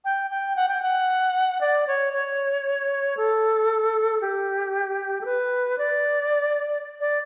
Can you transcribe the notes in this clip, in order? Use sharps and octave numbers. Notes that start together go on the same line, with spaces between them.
G5
G5
F#5
G5
F#5
D5
C#5
C#5
A4
G4
A4
B4
D5
D5